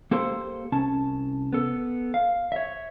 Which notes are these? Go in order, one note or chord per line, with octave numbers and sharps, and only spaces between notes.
A#3 G4 A4 C5 C6
C2 C#4 A5
B3 A4
F5
C#5 E5